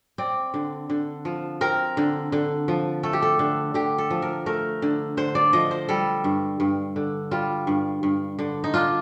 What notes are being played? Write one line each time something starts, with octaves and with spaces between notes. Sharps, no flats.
C4 D5
D3
D3
F3
C4 A#4
D3
D3
F3
A3 A4
G4
A4
D3
D3 G4
A4
F3
A#4
A3 A#4
D3
D3 C5
D5
F3 D#5
C5
G3 A4
G2
G2
D3
G3 F4
G2
G2
D3
D#4
D4 F4